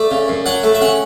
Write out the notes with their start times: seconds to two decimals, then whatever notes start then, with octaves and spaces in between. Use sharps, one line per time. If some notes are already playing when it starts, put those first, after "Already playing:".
Already playing: A3 D5
0.11 C#3
0.28 F#2
0.46 F#3 F#5
0.63 A3
0.75 E5
0.81 C#3 F#5